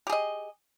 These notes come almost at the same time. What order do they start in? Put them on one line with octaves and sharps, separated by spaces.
G4 G#4 D#5